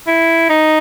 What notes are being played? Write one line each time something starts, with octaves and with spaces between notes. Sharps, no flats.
E4
D#4